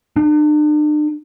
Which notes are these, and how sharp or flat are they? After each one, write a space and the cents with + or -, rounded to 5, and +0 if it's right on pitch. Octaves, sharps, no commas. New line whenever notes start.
D4 +40